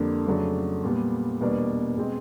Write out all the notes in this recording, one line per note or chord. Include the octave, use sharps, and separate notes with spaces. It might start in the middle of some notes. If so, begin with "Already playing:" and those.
Already playing: F2 D3 G3 A#3 D4
F2 C#3 F#3 A3 D4
A#2 G3 B3
E2 B2 G3 A#3 D4
B2 G#3 C4